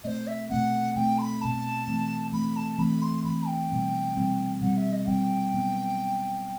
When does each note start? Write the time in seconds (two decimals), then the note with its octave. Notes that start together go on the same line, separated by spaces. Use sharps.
0.04 B2 A3 C4 C5 D#5
0.27 E5
0.50 B2 A3 C4 F#5
0.96 B2 A3 C4 G5
1.18 C6
1.22 B5
1.41 B2 A3 C4 A5
1.87 E3 A3 C4
2.32 E3 A3 C4 B5
2.56 A5
2.79 E3 A3 C4 B5
3.02 C6
3.25 E3 A3 C4 B5
3.47 G5
3.70 B2 G3 C4
4.16 B2 G3 C4
4.61 B2 G3 C4 F#5
4.77 E5
4.92 D#5
5.08 B2 G3 C4 G5
5.54 B2 F#3 B3